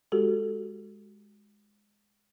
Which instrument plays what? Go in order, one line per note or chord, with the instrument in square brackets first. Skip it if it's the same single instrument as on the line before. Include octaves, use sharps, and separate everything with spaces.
[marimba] G#3 F#4 G4 A4